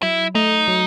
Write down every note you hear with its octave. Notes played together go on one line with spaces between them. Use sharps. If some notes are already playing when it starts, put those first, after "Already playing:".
F#3 E4
A3 D#4
F#3